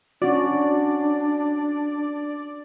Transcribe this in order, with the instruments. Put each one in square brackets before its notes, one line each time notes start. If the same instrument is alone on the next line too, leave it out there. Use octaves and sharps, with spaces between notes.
[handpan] C#4 F#4 [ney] D4 [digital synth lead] D5